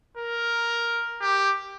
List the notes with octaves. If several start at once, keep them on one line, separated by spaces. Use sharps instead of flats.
A#4
G4